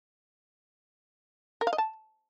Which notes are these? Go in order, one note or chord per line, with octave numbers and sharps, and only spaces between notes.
A#4
F5
D#5
A5